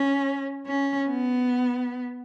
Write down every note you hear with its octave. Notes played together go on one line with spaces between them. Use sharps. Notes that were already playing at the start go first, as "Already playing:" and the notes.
Already playing: C#4
C#4
B3